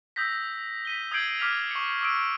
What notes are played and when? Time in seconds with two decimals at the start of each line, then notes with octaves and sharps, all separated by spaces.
0.16 D#6 E6 G6 A#6 B6
0.85 B6 D#7 G7
1.11 D#6 G6 G#6 C7 D7 F#7
1.39 D6 F6 B6 F7
1.71 C#6 C#7
2.01 D6 E6 D7